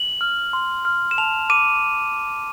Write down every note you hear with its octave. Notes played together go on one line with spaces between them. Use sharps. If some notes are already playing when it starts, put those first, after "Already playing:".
Already playing: F#7
F6
C6
F6
E7
A5 F7
D6 D#7